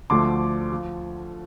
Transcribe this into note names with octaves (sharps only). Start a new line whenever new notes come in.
D2 D3 F3 A3 C6 D6
F3